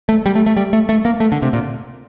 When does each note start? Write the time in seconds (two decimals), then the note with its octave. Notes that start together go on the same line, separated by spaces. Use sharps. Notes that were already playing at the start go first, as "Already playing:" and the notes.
0.09 A3
0.26 G3
0.35 A3
0.46 A3
0.57 G3
0.73 A3
0.89 A3
1.05 A#3
1.20 A3
1.32 D3
1.42 C3
1.53 A#2